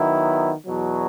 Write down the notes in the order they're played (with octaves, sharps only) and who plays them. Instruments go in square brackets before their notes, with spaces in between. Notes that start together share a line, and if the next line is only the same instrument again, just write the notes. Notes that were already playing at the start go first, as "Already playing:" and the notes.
Already playing: [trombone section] D#3 F#3 B3 E4
E2 B2 F#3